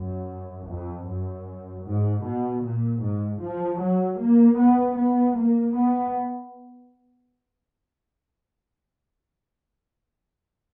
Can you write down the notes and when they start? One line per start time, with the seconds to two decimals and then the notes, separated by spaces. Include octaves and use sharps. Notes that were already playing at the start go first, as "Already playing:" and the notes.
Already playing: F#2
0.69 F2
1.07 F#2
1.85 G#2
2.24 B2
2.63 A#2
3.02 G#2
3.41 F3
3.80 F#3
4.19 A#3
4.57 B3
4.97 B3
5.36 A#3
5.75 B3